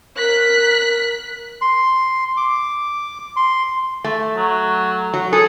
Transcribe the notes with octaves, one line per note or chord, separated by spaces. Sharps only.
A#4 F#6 B6
C6
D6
C6
A3
F#3
F#3
G#4 A4